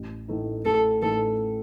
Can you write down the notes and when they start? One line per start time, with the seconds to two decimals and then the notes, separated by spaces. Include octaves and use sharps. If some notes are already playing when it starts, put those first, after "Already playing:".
Already playing: A1
0.28 A2 E3 A3 D#4
0.65 A1 A4
1.02 A2 E3 A3 D#4 A4